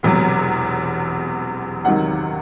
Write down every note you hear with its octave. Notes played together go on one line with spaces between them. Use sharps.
E1 E2 C3 F#3
C#2 C3 D#3 F#3 F#5